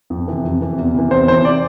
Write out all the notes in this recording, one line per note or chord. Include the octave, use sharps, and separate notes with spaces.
F2
C3 E3
F2
C3 E3
E2
C3 E3
E2 C5
C3 E3 C5
D5